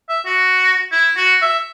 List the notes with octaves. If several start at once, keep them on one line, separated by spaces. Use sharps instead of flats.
E5
F#4
E4
F#4
E5